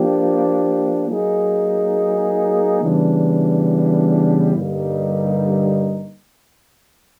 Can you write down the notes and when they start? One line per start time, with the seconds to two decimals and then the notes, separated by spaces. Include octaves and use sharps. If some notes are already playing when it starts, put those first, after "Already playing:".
Already playing: F3 A#3 D4 G4
1.08 F#3 A#3 D#4 G#4
2.82 C#3 E3 G3 B3 D4
4.55 G2 D3 G3 A#3 D#4